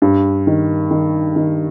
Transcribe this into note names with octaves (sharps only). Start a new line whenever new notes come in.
G2
D#3
D#3
D#3